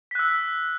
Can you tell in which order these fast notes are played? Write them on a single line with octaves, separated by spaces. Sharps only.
B6 F#6 E6